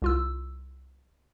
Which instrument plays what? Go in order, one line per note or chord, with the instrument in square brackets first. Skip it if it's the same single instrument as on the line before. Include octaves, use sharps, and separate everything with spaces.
[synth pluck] C2 F4 E6